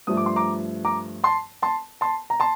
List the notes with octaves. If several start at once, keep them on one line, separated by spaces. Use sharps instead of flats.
G2 F3 A3 D#6
D6
C6
A#5 D6
A#5 D6
A5 C6
A5 C6
A5 C6
A#5
A5 C6